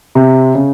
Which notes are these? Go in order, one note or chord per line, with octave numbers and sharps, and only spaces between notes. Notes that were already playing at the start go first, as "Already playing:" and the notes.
C3
C#3